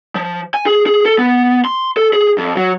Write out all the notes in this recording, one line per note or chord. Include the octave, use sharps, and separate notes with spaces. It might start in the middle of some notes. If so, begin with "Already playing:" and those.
F3
G#5
G#4
G#4
A4
B3
C6
A4
G#4
F2
F#3